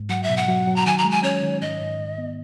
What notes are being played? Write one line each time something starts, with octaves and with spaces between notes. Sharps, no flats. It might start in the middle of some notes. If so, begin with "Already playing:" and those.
Already playing: G#2
F#3 F#5
E5
B2
F#5
F#3
F#3
A#5
D#3 G#5
A#5
G#3
G#5
C#4 C#5
D#3
G#2 D#5
G#2
G#2
B3